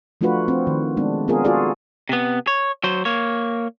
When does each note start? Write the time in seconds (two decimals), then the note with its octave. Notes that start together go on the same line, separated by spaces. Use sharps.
0.21 F3 A3 D4 F4 F#4 B4
0.48 C4
0.67 D#3
0.97 G#3 B3 D4
1.28 B3 C4 F4 G#4 A#4
1.45 F4 F#4 G#4 A4 D5
2.09 C3 B3
2.47 C#5
2.84 F#3 C5
3.05 A#3 C#5